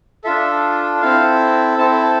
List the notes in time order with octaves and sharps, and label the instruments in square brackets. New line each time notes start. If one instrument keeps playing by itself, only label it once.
[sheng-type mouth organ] D4 F4 A4 E5
C4 E4 A4 F5
C4 E4 A4 A5
A5